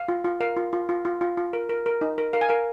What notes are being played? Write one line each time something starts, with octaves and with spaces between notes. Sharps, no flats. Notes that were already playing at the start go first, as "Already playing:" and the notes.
Already playing: F5
F4
F4
A#4 F5
F4
F4
F4
F4
F4
F4
A#4
A#4
A#4
D#4
A#4
A#4 F5
G#5
A#4 F5